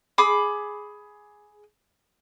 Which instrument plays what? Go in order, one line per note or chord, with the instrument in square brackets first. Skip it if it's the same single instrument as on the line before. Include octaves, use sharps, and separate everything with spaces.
[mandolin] G#4 B5 D6